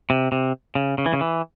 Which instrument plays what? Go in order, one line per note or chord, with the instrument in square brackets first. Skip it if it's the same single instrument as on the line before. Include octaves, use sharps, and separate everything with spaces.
[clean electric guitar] C3
C3
C#3
C#3
E3
C#3
E3